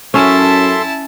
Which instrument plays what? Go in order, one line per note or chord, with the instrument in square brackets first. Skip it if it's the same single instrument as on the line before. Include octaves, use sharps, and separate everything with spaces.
[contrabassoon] F#2 [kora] C#4 [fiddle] E4 A5 [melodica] A4 E5 C6